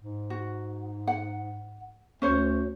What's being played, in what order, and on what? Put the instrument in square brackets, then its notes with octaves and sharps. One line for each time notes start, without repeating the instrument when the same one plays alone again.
[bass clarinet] G#2
[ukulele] F#4
F#5
[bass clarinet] D2 [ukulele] C#4 C5 C#5